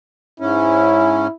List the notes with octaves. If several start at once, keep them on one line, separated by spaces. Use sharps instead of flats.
G#2 C#4 E4